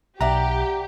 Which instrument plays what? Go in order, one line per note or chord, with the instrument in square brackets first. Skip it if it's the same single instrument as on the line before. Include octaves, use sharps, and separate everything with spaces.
[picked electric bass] B1 [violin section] G4 [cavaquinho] D5 E5 F#5 [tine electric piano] A#5